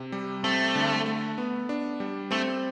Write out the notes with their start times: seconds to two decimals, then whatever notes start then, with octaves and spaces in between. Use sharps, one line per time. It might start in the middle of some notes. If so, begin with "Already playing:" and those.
Already playing: C3
0.12 G3
0.44 A3 C4
0.75 D3
1.06 A3
1.38 B3
1.69 D4
2.00 G3
2.31 A3 C4